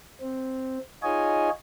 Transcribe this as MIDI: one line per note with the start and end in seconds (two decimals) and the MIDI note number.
0.21 0.78 60
1.03 1.50 63
1.03 1.50 65
1.03 1.50 68
1.03 1.50 73
1.03 1.50 75
1.03 1.50 80